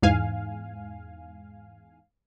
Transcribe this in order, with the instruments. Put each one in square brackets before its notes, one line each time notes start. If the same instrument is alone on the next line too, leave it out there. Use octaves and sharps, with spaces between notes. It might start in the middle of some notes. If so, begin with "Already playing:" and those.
[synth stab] E2 G#2 F5 G#5